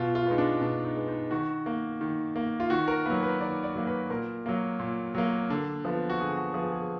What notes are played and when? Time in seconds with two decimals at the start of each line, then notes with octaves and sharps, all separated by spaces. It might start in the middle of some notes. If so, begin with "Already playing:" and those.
Already playing: B2 F4
0.15 F4
0.27 G#3 B3 D#4
0.38 D4
0.61 B2 D4
0.84 D#4
0.96 G#3 B3
1.08 D#4
1.31 D#3 F#4
1.66 A#3
2.01 D#3
2.36 A#3
2.60 F4
2.70 D#3 F#4
2.88 A#4
3.06 F#3 A#3 B4
3.23 B4
3.41 D#3 D5
3.63 D5
3.75 F#3 A#3
3.87 B4
4.10 A#2 A#4
4.46 F#3 A#3
4.79 A#2
5.15 F#3 A#3
5.50 D3
5.85 F3 B3
6.10 F#4
6.20 D3 G#4
6.37 F#4
6.54 F3 B3 G#4
6.72 G#4